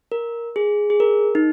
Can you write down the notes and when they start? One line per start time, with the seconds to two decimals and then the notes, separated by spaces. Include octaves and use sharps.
0.12 A#4
0.56 G#4
0.90 G#4
1.00 A#4
1.35 D#4